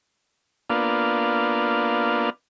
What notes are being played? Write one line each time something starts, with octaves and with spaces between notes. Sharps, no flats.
A#3 B3 D4 F4